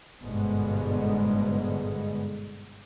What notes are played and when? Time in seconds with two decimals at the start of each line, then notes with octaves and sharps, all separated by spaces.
0.21 G1 G#2 B2 D3 G#3 B3